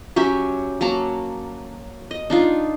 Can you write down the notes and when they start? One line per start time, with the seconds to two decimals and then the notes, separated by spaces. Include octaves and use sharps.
0.16 F#3 C#4 G4 E5
0.81 F#3 A#3 A5 A#5
2.11 D#5
2.30 D4 D#4 F4